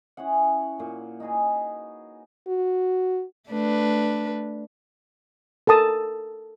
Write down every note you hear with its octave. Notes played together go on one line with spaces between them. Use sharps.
C#4 E4 G#4 F#5
A#2 C#6
D#4 F#4 G#4 B4
F#4
A3 D4 B4
A4 A#4 A5 D#6